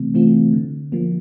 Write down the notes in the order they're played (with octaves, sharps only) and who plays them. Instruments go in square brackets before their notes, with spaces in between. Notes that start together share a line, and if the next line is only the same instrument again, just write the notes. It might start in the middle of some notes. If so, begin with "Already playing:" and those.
Already playing: [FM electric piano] C3 E3 A3 C4
E3 A3 C4 F4
D3
F3 A#3